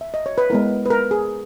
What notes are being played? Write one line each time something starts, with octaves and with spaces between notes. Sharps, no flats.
E5
D#5
C#5
B4
G#3 B3 E4 A#4
B4
A#4
G#4